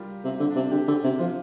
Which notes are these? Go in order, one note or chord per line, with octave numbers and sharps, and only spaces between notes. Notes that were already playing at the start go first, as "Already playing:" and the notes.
Already playing: G3 F4 G4 A#4
C3
C4
D3
D4
C3
D3 G4
D3 G4
C3 G4
F3 F4